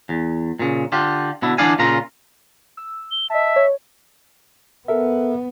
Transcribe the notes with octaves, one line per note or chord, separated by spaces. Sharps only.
E2
A#2 C#3
D3 F4 G4
B2 D3 E4
D3 E3 D4 D5 F5 G#5
A#2 C#3 F4 A#5
E6
G7
D#5 E5 A5
C#5
B3 A4 A#4 E5